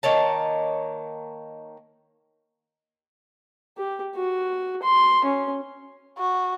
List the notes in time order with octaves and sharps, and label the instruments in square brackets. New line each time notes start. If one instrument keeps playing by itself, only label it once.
[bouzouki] D#3 A#3 C#5 A5
[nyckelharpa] G4
F#4
C6
C#4
[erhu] F#4